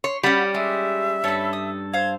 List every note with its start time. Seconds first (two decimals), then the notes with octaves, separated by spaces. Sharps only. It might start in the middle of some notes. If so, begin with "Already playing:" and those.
0.04 C#5 C6
0.23 G3 C#4 F#4 G4 B5
0.55 G#3 G4 E5
1.24 G2 A4 C#5 B5
1.53 D#6
1.93 C5 F5 G#6